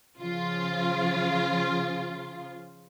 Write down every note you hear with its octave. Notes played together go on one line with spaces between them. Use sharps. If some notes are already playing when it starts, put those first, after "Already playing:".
C#3 F3 F4